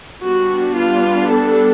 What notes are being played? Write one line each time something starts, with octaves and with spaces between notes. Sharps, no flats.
G3 B3 D4 F#4
F4
A4